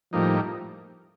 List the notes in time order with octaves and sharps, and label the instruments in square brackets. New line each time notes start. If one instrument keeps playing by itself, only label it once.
[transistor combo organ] A2 G3 A#3 D#4 [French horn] F3